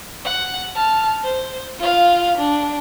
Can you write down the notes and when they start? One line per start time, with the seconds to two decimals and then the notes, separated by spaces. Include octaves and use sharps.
0.25 F#5
0.75 A5 F6
1.24 C5
1.79 F4 F5
2.37 D4